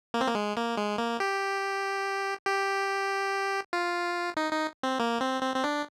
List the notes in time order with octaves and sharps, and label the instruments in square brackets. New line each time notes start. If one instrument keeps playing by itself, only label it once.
[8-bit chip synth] A#3
C4
A#3
G#3
A#3
G#3
A#3
G4
G4
F4
D#4
D#4
C4
A#3
C4
C4
C4
D4